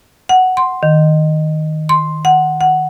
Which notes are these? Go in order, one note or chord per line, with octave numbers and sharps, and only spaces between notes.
F#5
C6
D#3
C6
F#5
F#5